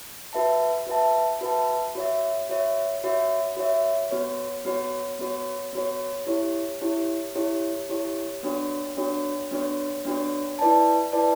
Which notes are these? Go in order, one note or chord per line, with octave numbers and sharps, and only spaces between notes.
F#4 B4 E5 A5
F#4 B4 E5 A5
F#4 B4 E5 A5
F#4 C#5 E5
F#4 C#5 E5
F#4 C#5 E5
F#4 C#5 E5
B3 F#4 C#5
B3 F#4 C#5
B3 F#4 C#5
B3 F#4 C#5
E4 G4 C#5
E4 G4 C#5
E4 G4 C#5
E4 G4 C#5
B3 D4 F#4 C#5
B3 D4 F#4 C#5
B3 D4 F#4 C#5
B3 D4 F#4 C#5
E4 B4 D5 A5
E4 B4 D5 A5